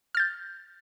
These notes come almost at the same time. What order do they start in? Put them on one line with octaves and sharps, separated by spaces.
F6 A6 G6